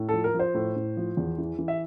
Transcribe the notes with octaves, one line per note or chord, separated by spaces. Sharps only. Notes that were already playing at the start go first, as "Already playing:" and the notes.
Already playing: A2
F3 A4
A#4
F3
C5
A2
A2
F3
E2
E3
E3
E5